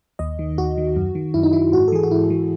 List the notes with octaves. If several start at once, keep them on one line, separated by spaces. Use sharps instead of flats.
D#2 D#5
D#3
D#2 F#4
D#3
F#2
D#3
F#2 E4
D#4
D#3 E4
G#2 F#4
A4
E3 G#4
F#4
G#2 E4
E3